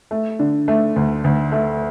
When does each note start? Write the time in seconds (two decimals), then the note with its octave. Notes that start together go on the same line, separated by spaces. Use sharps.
0.11 A3
0.39 D3
0.68 A3
0.96 D2
1.24 D2
1.52 A3